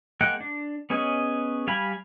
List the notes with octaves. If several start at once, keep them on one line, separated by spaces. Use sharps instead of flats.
G#3 A#3 F#5 G5 F#6
D4
B3 C#4 G#4 C#5 D#5
G3 F5 G#5 B5